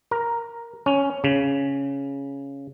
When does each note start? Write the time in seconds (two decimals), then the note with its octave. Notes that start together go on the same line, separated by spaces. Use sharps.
0.11 A#4
0.86 C#4
1.24 C#3